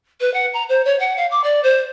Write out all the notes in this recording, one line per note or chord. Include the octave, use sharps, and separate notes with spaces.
B4
F#5
A#5
C5
C#5
F#5
F5
D6
D5
C5